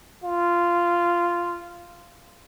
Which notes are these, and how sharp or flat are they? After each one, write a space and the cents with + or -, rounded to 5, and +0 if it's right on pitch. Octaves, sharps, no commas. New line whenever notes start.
F4 -10